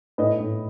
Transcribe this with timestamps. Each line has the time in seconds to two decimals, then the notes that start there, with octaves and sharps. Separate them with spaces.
0.18 A2 B4 D#5
0.40 A2